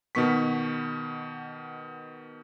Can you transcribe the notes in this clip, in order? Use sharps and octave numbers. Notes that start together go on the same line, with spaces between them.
B2 D#3 B3 C#6 B6